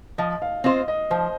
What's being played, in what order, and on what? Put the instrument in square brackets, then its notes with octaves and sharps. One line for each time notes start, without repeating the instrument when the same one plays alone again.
[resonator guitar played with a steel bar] F3 [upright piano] D#5
[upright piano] F5
[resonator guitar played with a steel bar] C4 F4 C5 [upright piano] D#5
[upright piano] D#5
[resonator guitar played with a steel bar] F3 [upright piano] C5